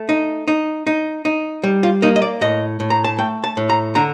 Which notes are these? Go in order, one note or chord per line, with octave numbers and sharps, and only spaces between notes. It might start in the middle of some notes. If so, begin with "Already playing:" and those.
Already playing: A3
D#4
D#4
D#4
D#4
G3
F4
A#3 D#4
D#5
D5
A2 D#5
A2
A#5
A5
A3 G5
A5
A2
A#5
D3 A#5